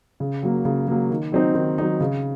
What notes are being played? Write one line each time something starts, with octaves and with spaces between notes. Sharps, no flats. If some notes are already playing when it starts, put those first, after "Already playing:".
C#3
F#3 A#3
C#3
F#3 A#3
D#3
F#3 C4 D#4
D#3
F#3 C4 D#4
C#3